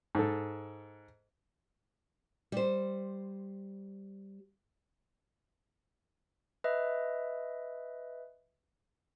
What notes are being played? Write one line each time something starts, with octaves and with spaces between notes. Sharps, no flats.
G#2 A4
G3 C5
B4 D#5 E5